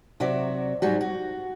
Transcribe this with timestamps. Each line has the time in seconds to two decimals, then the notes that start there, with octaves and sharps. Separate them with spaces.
0.20 C3 F#3 F#4 D5 E5
0.82 G#2 F#3 G3 F#4
1.01 F#4